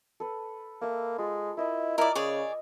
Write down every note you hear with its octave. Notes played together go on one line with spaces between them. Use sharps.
A4 B4
A#3 A4 E5
G#3 F4
E4 A#4 D#5 B5
E4 A#4 D5 D#5 E6
C#3 G#4 C#5 D5